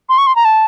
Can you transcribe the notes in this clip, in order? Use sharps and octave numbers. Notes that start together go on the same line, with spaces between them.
C6
C#6
C6
A#5
A5